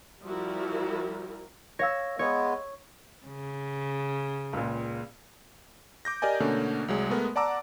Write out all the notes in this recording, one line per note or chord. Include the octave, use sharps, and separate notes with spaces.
F3 G3 E4 F#4 A#4
C#5 F5 E6 A#6
G#3 B3 C#5
C#3
C#2 A#2
D6 G6 A#6
G4 A#4 D5 D#5 G#5
B2 D3 A3 A#3 C#4
C2 F#3 G#3
G#3 A3 B3 A#4
D5 F#5 A5 A#5 D6 E6